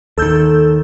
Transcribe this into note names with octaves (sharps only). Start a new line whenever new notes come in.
D#2 D#3 A4 E6 G6